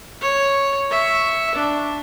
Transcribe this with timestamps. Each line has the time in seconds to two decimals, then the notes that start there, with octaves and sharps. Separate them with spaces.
0.21 C#5
0.90 E5 C#6
1.55 D4